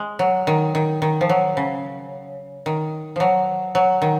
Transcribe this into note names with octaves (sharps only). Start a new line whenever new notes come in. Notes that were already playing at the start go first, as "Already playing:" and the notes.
Already playing: G#3
F#3
D#3
D#3
D#3
F3
F#3
C#3
D#3
F3 F#3
F#3
D#3